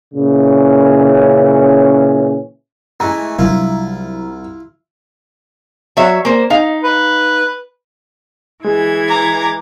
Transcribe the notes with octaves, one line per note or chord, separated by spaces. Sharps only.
A#2 C#3 E3 C#4
E3 G#3 A3 A#5
C2 F#3 D4 E4 F4
F#3 C#5 E5
A#3 C5
D#4 F5
B4
E3 G#3 G#6
A#5 D6